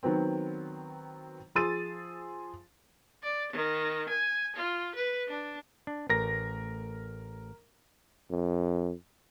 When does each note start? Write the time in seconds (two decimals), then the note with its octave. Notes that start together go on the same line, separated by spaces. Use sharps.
0.03 D#3 F#3 B3 C4
1.55 F3 G#4 C6 E6 A6 D#7
3.23 D5
3.53 D#3
4.09 G#5
4.56 F4
4.95 B4
5.28 D4
5.87 D4
6.09 A1 A#4 A#6
8.30 F2